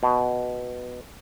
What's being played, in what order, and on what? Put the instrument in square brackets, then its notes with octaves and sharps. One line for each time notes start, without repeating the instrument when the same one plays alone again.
[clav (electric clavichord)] B2